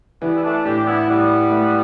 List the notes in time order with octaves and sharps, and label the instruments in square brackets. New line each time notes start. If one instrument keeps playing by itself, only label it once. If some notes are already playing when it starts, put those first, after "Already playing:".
[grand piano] E3 [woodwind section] G3 B3
[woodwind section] E4
A3 D4
[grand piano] A2 [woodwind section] D4 G4
[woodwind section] B3 E4
[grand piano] A2 [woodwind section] G3 B3
[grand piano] A3